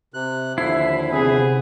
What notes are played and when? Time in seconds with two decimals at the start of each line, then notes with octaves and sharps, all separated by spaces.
0.14 C3 F#6
0.58 D#2 D3 F3 E4 C7
1.13 C3 B3 G#4